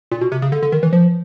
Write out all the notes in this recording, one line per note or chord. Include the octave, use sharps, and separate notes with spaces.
A#2
B2
C3
C#3
D3
D3
D#3
E3
F3